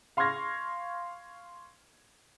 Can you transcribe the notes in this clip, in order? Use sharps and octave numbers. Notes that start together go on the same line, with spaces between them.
F5 C6 C#6 F6 G#6 A#6